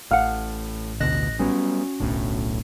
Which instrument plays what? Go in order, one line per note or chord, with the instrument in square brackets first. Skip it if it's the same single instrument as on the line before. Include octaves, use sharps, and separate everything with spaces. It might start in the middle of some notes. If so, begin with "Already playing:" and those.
[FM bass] A1 [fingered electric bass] A2 [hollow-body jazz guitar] F5 F#5
[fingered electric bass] D2 B2 D3 [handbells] D#5 F#6 A#6
[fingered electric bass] F#3 G3 B3 [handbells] C#4 F#4
[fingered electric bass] D1 B1 D4 [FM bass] A2